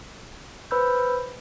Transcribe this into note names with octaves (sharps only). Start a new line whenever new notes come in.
B4 C5 B5 E6 G6